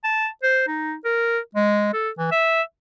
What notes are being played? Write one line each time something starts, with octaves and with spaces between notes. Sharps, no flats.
A5
C5
D#4
A#4
G#3
A4
E3
E5